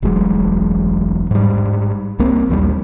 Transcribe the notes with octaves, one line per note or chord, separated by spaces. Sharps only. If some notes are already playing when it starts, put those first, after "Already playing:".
E1 A1 F#3 G#3
G#2 G3
C2 A#3 C4
A#1 D#2 D#3 G3